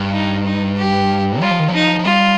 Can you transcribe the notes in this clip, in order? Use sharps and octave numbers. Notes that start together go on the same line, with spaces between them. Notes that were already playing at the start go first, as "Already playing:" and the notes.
Already playing: G2
D#4
D#4
G4
G3 F4
F3
D#3
F3
D#4
F3
G3 F4